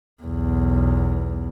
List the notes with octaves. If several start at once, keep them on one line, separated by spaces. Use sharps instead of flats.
B1 E2